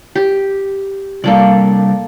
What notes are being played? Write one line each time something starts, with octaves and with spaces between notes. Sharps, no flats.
G4
C3 G3 A#3 D4 A4 D5